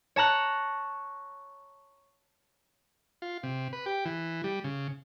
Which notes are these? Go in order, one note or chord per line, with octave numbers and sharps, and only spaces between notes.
C#5 A5 A#5 F#6 C#7
F4
C3
B4
G4
E3
G3
C#3